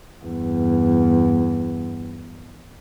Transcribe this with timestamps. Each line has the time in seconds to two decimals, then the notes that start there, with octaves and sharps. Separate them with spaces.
0.23 E2 G2